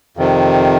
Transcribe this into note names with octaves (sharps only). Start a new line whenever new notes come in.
F2 C3 D#3